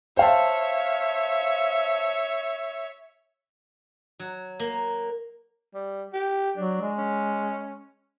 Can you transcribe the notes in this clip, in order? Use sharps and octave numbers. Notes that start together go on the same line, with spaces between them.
C5 C#5 E5 F5 A5
F#3
A#3
G3
G4
F#3 D4
G#3
C#4